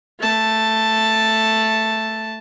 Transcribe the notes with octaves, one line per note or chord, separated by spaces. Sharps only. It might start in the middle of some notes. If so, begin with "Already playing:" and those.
A3 A5